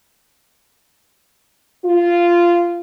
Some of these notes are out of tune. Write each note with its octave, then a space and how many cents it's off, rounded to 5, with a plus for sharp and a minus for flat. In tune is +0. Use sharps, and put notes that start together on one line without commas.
F4 -10